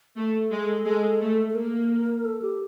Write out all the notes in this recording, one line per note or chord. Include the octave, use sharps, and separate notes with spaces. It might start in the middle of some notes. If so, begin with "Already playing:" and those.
A3 A4
G#3
G#3
A3
A4
A#3 A#4
A4
G4